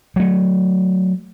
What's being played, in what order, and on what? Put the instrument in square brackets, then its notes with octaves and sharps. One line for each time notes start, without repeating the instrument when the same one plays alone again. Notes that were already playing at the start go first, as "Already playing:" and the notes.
[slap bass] F#3 A3